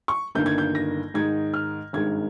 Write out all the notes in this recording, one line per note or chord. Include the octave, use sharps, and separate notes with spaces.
C#6
G1 G2 D#3 A#3 G6
G#6
G6
A#6
G#2 D#3 G#3 D#4 G#6
F6
G#1 G2 D#3 G#3 G#6